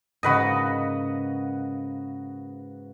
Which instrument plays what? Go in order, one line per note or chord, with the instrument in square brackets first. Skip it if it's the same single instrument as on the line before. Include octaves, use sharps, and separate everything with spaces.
[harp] G#2 C#3 A#3 [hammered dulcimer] F#4 B4 D#5